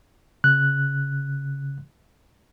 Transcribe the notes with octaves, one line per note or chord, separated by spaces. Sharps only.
C#3 F#6